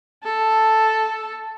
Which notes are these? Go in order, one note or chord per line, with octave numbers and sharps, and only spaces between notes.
A4